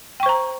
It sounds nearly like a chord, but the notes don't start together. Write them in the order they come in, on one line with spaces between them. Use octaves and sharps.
G5 C#6 C5 A#5